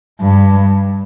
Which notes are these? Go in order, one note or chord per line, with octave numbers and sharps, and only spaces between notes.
G2